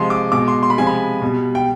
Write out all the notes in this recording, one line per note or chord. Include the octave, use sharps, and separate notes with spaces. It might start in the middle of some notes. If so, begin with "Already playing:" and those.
Already playing: C3 F3 G#3 C6
D6
B2 G#3 D6
C6
C6
B5
C3 F3 G#3 G#5
B5
B2 G3
G5